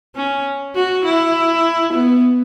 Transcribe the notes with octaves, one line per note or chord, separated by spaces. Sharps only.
C#4
F#4
E4
B3